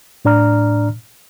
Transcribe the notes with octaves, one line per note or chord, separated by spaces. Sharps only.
A2 D4 D5 A#5 F6